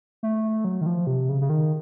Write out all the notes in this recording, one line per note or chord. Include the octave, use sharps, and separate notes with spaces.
A3
F#3
D#3
F3
C3
C#3
C#3
D#3